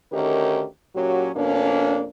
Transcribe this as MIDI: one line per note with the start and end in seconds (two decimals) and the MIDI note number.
0.13 0.65 38
0.13 0.65 51
0.13 0.65 61
0.13 0.65 63
0.13 0.65 67
0.13 0.65 70
0.96 1.31 46
0.96 1.31 54
0.96 1.31 61
0.96 1.31 66
0.96 1.31 67
1.36 2.05 41
1.36 2.05 47
1.36 2.05 58
1.36 2.05 61
1.36 2.05 62